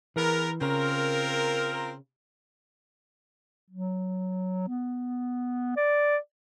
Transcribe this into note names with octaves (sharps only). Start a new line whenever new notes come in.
E3 B3 G#4 A#4
C#3 C4 F4 A#4
F#3
B3
D5